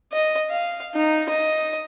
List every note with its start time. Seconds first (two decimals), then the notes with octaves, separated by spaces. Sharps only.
0.12 D#5
0.50 F5
0.95 D#4
1.29 D#5